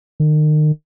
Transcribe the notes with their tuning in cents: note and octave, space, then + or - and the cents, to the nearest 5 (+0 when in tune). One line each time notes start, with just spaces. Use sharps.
D#3 -35